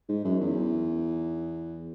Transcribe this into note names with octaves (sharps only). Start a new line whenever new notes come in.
G#2
F#2
E2